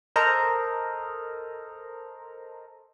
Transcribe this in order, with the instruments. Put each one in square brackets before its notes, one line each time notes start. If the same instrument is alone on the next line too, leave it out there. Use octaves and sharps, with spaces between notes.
[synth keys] A4 A#4 C5 D#5 A#5